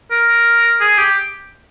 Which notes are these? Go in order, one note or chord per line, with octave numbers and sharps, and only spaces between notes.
A#4
G#4
G4